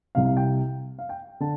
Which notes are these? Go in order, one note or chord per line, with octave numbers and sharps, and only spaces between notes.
C2 C3 F5
F5
G5
F5
G5
D3 A5